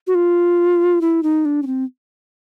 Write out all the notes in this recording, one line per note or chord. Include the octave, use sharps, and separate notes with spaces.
F#4
F4
E4
D#4
D4
C#4
C4